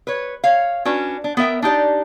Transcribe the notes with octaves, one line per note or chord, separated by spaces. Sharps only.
B4 C#5
C#5 F5
C#4 D4 F#4 B4
D4
B3 A#4 E5 G5
D4 D#4 G4 D5